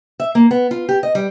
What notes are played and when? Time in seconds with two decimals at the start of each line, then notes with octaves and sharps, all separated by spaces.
0.20 E5
0.35 A#3
0.51 B3
0.71 F4
0.89 G4
1.03 D#5
1.15 G3